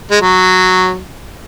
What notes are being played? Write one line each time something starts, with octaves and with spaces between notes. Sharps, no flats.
G#3
F#3